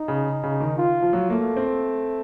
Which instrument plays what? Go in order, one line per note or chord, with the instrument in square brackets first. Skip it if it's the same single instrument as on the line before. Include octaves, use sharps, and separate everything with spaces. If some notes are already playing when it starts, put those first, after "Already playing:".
Already playing: [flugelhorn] D#4
[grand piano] C#3
C#3
D#3
[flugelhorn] F4
[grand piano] F3
F#3
[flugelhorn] A3 [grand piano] A#3
[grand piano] C4